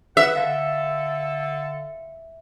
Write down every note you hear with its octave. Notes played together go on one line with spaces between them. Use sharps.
B4 E5 F#5 E6
D3 A4 F5